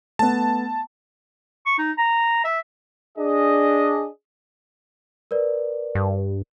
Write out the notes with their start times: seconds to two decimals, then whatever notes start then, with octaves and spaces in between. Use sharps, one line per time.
0.19 A3 B3 A5
1.66 C#6
1.79 D#4
1.98 A#5
2.44 E5
3.17 D4 G#4 D#5
5.31 A#4 B4 D5
5.95 G2